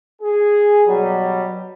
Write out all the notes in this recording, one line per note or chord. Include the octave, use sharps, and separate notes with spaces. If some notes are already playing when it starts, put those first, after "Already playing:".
G#4
B2 F#3 G3